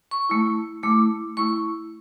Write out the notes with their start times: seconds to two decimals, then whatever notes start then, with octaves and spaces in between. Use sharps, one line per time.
0.11 C#6
0.29 A3 E4
0.83 A3 E4 D6
1.37 A3 E4 C#6